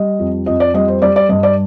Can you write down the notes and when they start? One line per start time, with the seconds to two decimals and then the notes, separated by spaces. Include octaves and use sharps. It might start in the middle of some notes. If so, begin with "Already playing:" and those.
Already playing: G3 D#5
0.19 F2
0.46 F2 D#5
0.60 D5
0.74 G3 D#5
0.88 C5
1.02 G3 D5
1.16 D5
1.29 G2 D#5
1.43 D5